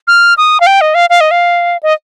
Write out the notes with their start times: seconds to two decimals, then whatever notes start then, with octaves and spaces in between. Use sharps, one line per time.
0.07 F6
0.38 D#6
0.60 F5
0.67 G5
0.81 D#5
0.95 F5
1.10 F5
1.21 D#5
1.31 F5
1.83 D#5